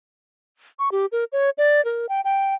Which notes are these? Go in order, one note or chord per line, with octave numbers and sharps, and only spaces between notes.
C#6
G4
A#4
C#5
D5
A#4
G5
G5